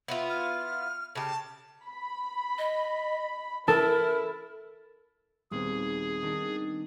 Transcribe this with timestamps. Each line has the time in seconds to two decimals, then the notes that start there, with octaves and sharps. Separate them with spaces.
0.08 B3 E4 F4
0.29 F6
1.15 C#3 G4 A5
1.84 B5
2.58 D#5
3.68 E4 A4 A#4
5.51 D#1 G3 B3 C4 G#4
6.22 D#3 D4 D#4